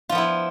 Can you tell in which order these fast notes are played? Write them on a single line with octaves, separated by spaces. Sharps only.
F4 F3 B3 E4